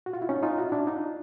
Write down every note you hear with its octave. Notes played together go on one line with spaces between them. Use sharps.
F#4
F4
E4
C#4 D#4
D#4 F4
E4 F#4
D4 E4
D#4 F4